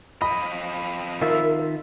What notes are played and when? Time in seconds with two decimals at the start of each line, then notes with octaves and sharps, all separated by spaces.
0.22 F2 D#5 B5
1.21 D#3 F4 A#4 E5